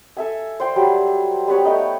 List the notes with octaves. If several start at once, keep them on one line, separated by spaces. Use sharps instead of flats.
A4 E5 G#5
C5 D5 G5 C6
F#3 G3
G3 B3 B4 C#5
A3 D#4 G5